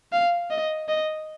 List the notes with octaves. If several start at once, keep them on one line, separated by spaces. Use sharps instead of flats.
F5
D#5
D#5